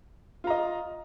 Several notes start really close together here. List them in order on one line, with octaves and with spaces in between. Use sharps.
F4 A#5 D#5